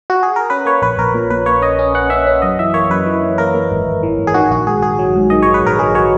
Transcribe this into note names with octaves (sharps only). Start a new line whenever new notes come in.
F#4
G#4
A#4
C#4 B4
A#3 C#5
A#1 B4
A#1 A#4
A#2
A#2 B4
A#3 C#5
C#4 D#5
C#4
C#4 F#5
C#4 E5
C#4
F#2 D#5
E3 E5
A#3 C#5
F#2 B4
E3
E3
A#3 A#4
A#3
G#1
G#1
E3
G#1
G#4
D#3 F#4
A#1 F#4
G#2 G#4
A#1 G#4
F#3
G#2
D#3 D#5
D#3 C#5
B4
A#1 A#4
F#3 G#4
F#3 C#5